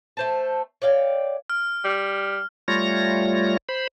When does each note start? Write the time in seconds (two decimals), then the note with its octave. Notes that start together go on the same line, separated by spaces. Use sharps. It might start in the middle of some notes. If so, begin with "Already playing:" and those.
0.17 A3 C5 A5
0.82 C#5 D5 F5 G5
1.50 F6
1.85 G3
2.68 G3 A3 F4 C#5 A#6
3.69 C5 B5